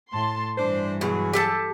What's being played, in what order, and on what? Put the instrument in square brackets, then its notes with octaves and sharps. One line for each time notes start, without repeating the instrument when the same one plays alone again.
[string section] A2 A5 C6
[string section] G2 E3 [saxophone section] D4 C5
[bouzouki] B2 [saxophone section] F#3 G#4
[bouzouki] G4 A4 A5